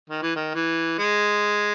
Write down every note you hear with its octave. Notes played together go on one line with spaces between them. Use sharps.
D#3
E3
D#3
E3
G#3